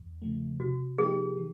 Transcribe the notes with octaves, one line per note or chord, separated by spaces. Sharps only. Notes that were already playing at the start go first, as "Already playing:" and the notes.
Already playing: E2
C#3 F3 A3
C3 F#4
F3 A#3 D#4 G4 G#4
E3